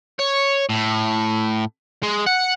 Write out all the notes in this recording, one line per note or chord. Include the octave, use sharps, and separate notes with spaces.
C#5
A2
G#3
F#5